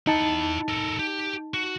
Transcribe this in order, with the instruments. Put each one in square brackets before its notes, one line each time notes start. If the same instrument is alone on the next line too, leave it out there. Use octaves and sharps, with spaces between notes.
[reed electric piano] D#4 A5 [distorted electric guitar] E4 F#5
[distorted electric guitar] A4 A#4
G4
F#4